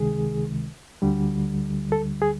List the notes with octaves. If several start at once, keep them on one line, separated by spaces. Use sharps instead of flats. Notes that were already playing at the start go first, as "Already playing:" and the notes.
Already playing: C#2 C3 D#3 G#3 G#4
D2 D3 G3
A4
G#4